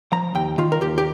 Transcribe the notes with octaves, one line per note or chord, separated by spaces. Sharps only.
F3 A#5
D#2 G5
D#3 F4
A#4
D#2 G4
G4